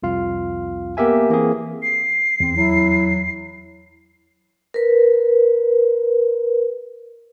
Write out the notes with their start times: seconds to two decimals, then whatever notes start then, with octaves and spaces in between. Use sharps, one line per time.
0.03 C2 F2 F4 F5
0.97 A#3 B3 G4 A#4 E5 G#5
1.30 E3 A#3 C4 G#4
1.82 C7
2.40 E2 C4
2.57 F#3 E4
4.74 A#4 B4